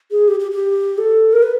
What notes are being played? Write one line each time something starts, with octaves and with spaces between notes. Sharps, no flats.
G#4
G4
G4
G4
A4
A#4
B4